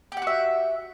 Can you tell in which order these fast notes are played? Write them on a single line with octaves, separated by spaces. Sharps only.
G4 F#5 F#4 E5